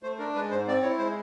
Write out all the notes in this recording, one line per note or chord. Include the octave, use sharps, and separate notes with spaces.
A3 C5
D4 A#4
G#3 B4
G#2 C5
C4 D5
E4 C#5
G#3 C5